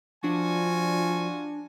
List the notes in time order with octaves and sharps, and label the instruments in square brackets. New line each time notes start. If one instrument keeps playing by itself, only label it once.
[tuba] F3 [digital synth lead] D4 [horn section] F4 F#4 G#5